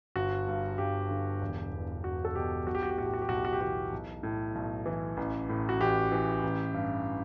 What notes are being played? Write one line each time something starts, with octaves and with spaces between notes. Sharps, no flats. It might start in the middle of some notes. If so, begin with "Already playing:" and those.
G1 F#4
G2
G1 G4
D3
E1
E2
E1 F#4
A4
B2 G4
B1 F#4
G4
F#4
G4
A2 F#4
G4
F#4
G4
B1 F#4
G4
F#4
G4
E3 F#4
B1
A2
B1
E3
A1
A2
F#4
A1 G4
E3
A1
G2